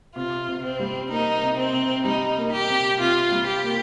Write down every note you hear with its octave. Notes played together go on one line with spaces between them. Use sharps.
C3 F4
C3
C4
G3
A#3 D#4
C3
C4
C3
G3 D#4
A#3
G4
C3
C3 F4
G3
G4
A#3